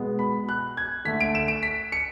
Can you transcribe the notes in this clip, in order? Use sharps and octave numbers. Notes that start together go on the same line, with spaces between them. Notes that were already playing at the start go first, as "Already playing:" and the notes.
Already playing: B2 G#3 B3
B5
F#6
G#6
D3 A3 B6
D7
E7
D7
B6
C#7